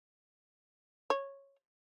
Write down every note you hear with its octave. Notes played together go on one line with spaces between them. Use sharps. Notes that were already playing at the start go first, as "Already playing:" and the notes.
C#5